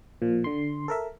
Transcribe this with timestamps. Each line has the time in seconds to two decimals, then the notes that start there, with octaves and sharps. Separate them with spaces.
0.22 A#2 F3
0.44 D3 C6
0.88 A4 A#4 E5